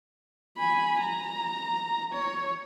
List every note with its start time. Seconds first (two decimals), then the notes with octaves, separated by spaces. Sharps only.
0.58 G#5 B5
1.00 A#5
2.13 C#5